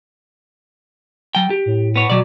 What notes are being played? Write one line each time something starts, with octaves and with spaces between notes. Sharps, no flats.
F#3 G5
G4
A2
B3 C#5
B2 F#3 D5